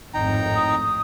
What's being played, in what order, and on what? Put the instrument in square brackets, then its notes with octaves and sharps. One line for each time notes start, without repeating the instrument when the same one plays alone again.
[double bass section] G#1 F2 A2 [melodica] D#4 G5 A#5
[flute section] D#6